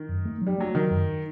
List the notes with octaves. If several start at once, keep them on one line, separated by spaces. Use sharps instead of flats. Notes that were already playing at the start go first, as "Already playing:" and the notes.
Already playing: D#3
F#2
A3
F#3
G3
F#3 A3
D#3 F#3
F#2